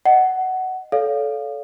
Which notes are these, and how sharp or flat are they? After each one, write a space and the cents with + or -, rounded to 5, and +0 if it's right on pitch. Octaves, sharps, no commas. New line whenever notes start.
D#5 +0 F#5 +15
A4 -15 C#5 +40 F5 +0